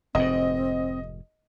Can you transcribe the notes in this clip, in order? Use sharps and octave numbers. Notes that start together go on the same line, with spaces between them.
F1 G#2 C4 D#5